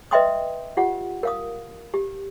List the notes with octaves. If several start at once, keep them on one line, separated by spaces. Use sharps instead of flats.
B4 D#5 E5 G5 C6 D#6
F4 G4 F#5
A#4 F5 D#6
G4